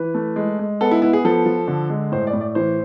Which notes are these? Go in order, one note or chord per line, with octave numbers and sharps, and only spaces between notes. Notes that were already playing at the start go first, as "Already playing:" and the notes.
Already playing: E3 B4
A3
G#3
G#3
B3 A4
E4
B3 E4
G#4
F3 A4
F3
D3
G#3
A2 C5
D5
A2
D5
E3 C5